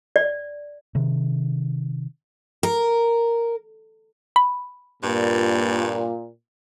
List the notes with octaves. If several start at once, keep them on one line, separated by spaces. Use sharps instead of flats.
D5
C3 D#3
A#4
B5
G2 A#2